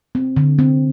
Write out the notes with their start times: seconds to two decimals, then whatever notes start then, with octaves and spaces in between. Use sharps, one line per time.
0.15 C4
0.36 D3
0.59 C4